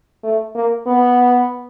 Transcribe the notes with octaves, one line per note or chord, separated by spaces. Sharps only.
A3
A#3
B3